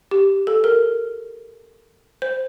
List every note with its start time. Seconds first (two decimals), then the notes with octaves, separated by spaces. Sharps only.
0.11 G4
0.47 A4
0.64 A#4
2.22 C5